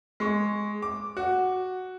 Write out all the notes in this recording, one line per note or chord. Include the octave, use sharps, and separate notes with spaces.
G#3 C#6
D6
F#4